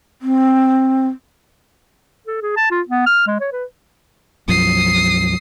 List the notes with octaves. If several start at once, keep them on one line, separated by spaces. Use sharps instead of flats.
C4
A4
G#4
A5
F4
B3
F6
G#3
C#5
B4
B1 F#2 F3 D#6 C7